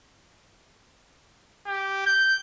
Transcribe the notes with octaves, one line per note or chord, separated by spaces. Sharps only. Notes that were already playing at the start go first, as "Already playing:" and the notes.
G4
G6